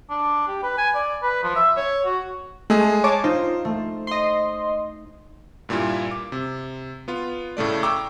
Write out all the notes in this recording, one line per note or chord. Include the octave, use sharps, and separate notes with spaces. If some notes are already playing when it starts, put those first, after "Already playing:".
D4
G4
B4
G#5
D5
B4
F3
E5
C#5
F#4
G#3 A3 G#4
C#5 A5 D6
D#4 F4 C5
A3
D#5 C6
G2 A#2 G3 E4 F4
D6
C3
B3 F4
A2 C#3 A3 D5
G5 A#5 C#6 D6 E6